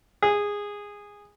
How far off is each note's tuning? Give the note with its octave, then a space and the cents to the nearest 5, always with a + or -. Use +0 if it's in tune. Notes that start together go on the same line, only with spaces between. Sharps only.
G#4 -15